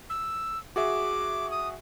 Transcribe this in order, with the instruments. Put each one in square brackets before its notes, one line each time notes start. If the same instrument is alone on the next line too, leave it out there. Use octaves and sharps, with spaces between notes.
[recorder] E6
[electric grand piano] F#4 G#4 E5 [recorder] D6
[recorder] D#6